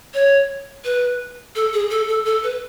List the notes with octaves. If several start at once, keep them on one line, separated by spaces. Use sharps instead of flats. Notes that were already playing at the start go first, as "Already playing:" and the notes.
C#5
B4
A4
G#4
A4
A4
A4
B4